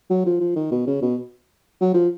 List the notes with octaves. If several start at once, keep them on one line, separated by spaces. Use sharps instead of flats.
F#3
F3
F3
D#3
B2
C#3
B2
F#3
F3